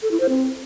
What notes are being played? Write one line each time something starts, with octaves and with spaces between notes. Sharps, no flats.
A4
E4
C5
C4